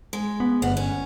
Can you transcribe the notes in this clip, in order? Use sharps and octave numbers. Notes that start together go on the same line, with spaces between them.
G#3
B3
G1 D2 B3
C#4